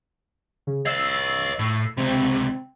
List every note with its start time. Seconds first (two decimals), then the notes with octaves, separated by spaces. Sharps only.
0.67 C#3
0.85 C#5 D#5 E6 C7
1.59 A2
1.97 C#2 C3 C4